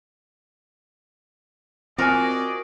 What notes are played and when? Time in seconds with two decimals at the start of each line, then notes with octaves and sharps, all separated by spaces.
1.98 C4 F4 F#4 G#4 A#4 D5 D#5 G#5